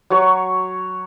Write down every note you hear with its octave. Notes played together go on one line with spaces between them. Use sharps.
F#3 C#5 C#6